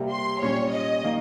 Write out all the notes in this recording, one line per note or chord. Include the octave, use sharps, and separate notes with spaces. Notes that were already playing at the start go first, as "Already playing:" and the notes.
Already playing: C3 G3 A#3
C6
A#2 G3 C#4 C#5
D#5
D#3 A#3